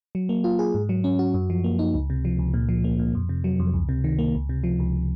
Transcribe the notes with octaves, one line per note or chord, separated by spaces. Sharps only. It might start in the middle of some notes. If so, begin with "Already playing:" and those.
F#3
A#3
F4
G#4
G#2
F#3
C#4
F#4
F#2
F3
A#3
D#4
C#2
C3
F3
C#2
A#2
F3
A#3
A#2
F2
C3
F#3
F2
C#2
C3
D#3
A#3
C#2
C3
F3
C#2